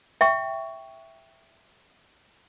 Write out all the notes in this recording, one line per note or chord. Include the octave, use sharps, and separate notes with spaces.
E5 G5 C#6